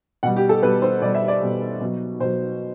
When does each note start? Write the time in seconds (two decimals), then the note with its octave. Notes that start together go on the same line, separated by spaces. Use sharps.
0.23 B2 G3 F#5
0.36 G4
0.49 A4
0.62 B2 B4
0.66 G3
0.82 C5
1.02 B2 D5
1.05 G3
1.15 E5
1.28 D5
1.41 B2 G3
1.81 B2 F#3
2.20 B2 F#3 C5